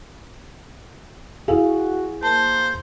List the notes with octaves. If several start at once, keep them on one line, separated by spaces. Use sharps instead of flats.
E4 F#4 G#4 F5
A#3 C5 A5